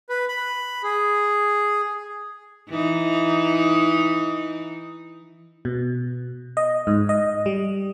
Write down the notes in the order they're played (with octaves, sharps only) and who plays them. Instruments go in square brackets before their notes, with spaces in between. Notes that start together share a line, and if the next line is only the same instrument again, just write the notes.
[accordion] B4
B5
G#4
[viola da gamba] E3 D#4
[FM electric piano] B2
D#5
G#2
D#5
G3